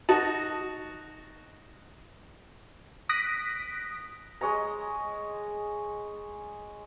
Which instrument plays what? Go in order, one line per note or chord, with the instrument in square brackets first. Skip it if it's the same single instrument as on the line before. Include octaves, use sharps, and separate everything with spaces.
[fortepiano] D#4 F#4 A5
[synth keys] D#6 F#6 A#6 B6 D7
[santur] G#3 C#5 D#5 A#5